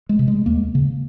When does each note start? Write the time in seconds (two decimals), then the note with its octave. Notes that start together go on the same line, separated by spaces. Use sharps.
0.09 G#3
0.19 C3
0.28 G#3
0.46 D#2 A#3
0.75 C#3